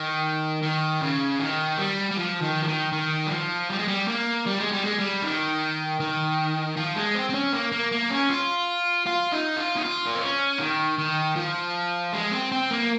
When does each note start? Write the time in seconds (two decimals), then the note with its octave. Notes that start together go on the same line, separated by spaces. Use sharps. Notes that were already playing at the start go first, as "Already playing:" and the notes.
Already playing: D#3
0.62 D#3
1.01 C#3
1.39 D#3
1.78 G3
2.11 G3
2.17 F3
2.41 D#3
2.63 F3
2.67 D#3
2.92 D#3
3.27 G3
3.31 F3
3.70 G3
3.79 G#3
3.88 G3
4.08 A#3
4.46 G3
4.59 G#3
4.72 G3
4.85 G#3
4.99 G3
5.22 D#3
6.00 D#3
6.76 F3
6.96 G#3
7.15 C4
7.29 C4
7.34 C#4
7.53 A#3
7.72 A#3
7.92 A#3
8.10 C#4
8.30 F4
9.06 F4
9.32 D#4
9.57 F4
9.77 D#4
9.83 F4
10.07 A#3
10.14 C4
10.21 C#4
10.59 D#3
10.98 D#3
11.36 F3
12.13 G#3
12.31 C4
12.52 C4
12.71 A#3